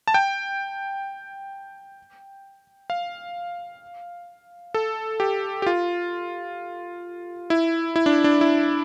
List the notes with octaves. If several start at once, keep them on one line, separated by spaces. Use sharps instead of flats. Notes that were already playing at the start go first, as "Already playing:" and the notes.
A5
G5
F5
A4
G4
G4
F4
E4
E4
D4
D4
E4